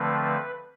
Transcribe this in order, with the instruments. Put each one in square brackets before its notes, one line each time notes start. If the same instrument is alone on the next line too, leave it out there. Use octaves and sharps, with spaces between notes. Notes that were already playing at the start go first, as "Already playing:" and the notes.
Already playing: [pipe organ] D3 F3 A3 C4 B4